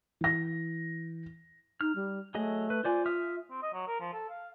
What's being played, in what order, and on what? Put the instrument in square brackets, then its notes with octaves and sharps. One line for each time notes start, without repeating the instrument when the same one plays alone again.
[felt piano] E3 A#6
[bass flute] D#4 [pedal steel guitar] F6
[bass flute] G3
[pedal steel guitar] F#3 G#4 D#5 [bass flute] A3
[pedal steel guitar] B4
[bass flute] F4 [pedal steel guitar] C5 D5 G#5
[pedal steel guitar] E5 D#6 F6
[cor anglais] C4
D#5
F#3
A#4
F3
A4
F5